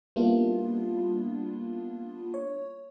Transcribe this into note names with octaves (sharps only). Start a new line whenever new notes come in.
G3 A#3 B3 D4 E4 F4
C#5